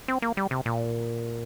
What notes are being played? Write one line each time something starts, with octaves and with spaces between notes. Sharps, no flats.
C4
A#3
G3
C3
A#2